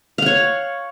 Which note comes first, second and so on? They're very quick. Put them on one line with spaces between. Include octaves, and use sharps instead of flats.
F5 F#5 C#5